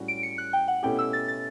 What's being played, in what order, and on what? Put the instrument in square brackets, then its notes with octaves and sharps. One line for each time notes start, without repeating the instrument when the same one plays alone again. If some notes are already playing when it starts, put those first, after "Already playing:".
Already playing: [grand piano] A2 G3 C#4 F#4
[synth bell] D7
C#7
F#6
G5
F#5
[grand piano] B2 A3 C#4 E4 G4 [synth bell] G5
[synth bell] E6
A6
A6